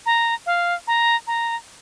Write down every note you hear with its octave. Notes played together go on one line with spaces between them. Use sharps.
A#5
F5
A#5
A#5